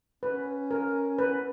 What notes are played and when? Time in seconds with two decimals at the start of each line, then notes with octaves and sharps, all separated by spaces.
0.23 C#4 B4
0.71 A#4
1.19 B4